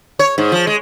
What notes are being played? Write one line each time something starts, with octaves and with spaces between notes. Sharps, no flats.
C#5
G#2
F3
G#3